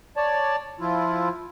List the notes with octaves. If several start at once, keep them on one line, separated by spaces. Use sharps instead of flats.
C#5 D5 A5
F3 E4 F4